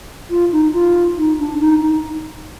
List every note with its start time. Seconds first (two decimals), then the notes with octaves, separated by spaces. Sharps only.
0.30 F4
0.52 D#4
0.74 F4
1.18 D#4
1.39 D4
1.60 D#4
1.82 D#4